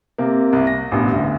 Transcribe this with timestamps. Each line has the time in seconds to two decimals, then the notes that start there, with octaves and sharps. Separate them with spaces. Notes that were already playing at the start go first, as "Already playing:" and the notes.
0.18 C3 A#3
0.53 C2
0.67 A#6
0.91 A1 G2 B2
1.13 D2